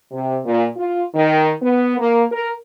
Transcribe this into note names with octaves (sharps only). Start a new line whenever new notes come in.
C3
A#2
F4
D#3
B3
A#3
A#4